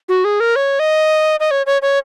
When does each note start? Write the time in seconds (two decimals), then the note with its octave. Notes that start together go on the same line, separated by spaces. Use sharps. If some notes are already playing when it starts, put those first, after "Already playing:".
0.09 F#4
0.24 G#4
0.40 A#4
0.56 C#5
0.79 D#5
1.40 D#5
1.51 C#5
1.66 C#5
1.82 C#5